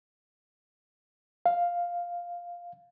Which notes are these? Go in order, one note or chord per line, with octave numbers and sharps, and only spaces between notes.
F5